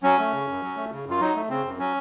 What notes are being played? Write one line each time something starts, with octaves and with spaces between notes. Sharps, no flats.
F#3 C#4
A3
C#3
F#2
F#3
A3
C#3
F#2 F4
F#3 D#4
A3
C#3 C4
F#2
F#3 C#4